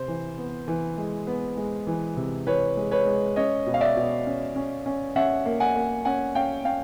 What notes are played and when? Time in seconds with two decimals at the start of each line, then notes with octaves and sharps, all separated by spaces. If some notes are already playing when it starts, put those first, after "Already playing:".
Already playing: C3 C5
0.08 E3
0.38 B3
0.68 E3
0.98 G#3
1.27 B3
1.57 G#3
1.87 E3
2.17 C3
2.47 E3 B4 C#5
2.77 G#3
2.91 B4 C#5
3.06 G#3
3.36 C#4 C#5 D#5
3.66 B2
3.74 F5
3.81 D5 E5
3.96 B2
4.27 C#4
4.56 C#4
4.86 C#4
5.16 C#4 E5 F#5
5.45 A#3
5.60 F#5 G#5
5.76 A#3
6.05 C#4 F#5 G#5
6.35 C#4 F5 G5
6.65 C#4 F5 G5